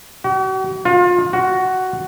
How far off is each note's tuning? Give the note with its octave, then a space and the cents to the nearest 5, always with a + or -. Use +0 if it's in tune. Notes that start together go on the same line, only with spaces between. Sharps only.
F#4 +45
F4 +30
F#4 +10